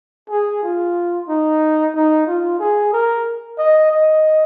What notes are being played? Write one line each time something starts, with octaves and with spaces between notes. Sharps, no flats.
G#4
F4
D#4
D#4
F4
G#4
A#4
D#5
D#5